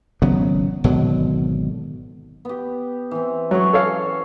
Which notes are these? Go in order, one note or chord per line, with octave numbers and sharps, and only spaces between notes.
G#1 C#3 F#3 B3
G#1 B2 D3 F#3
B3 G4
E3 C4
F#3 C#4 G#4 C#6
A4 C#5 F5